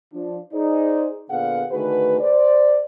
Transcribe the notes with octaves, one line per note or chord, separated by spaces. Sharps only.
F3 D4
D#4 G#4 C5 D5
A#2 D3 B3 G#4 F5 F#5
D3 D#3 A3 F#4 G#4 B4
C5 D5